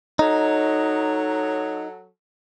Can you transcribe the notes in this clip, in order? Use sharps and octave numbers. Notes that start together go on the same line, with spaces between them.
F#3 D#4 A4 C#5